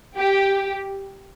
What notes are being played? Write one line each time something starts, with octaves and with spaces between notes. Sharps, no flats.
G4